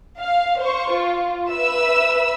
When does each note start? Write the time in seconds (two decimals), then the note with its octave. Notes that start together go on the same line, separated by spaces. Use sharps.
0.19 F5
0.60 C5 C#6
0.91 F4
1.50 B4 E5 E6